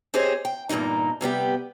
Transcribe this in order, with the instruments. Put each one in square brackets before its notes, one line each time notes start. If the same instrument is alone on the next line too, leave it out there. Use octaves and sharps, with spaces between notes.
[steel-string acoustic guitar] C4 G4 G#4 C5 C#5 D#5
G5
E2 G2 A#2 A#3 D#4
C3 G3 B3 G4